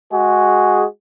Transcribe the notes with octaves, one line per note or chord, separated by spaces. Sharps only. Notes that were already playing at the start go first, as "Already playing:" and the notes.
G#3 F#4 G#4